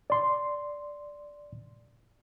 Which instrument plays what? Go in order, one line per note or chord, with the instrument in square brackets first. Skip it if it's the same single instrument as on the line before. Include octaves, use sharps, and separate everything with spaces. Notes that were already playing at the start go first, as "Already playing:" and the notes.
[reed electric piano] D5 C6